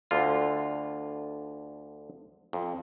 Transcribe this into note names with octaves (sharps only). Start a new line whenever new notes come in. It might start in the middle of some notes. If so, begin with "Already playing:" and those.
D2 D3 F4
F2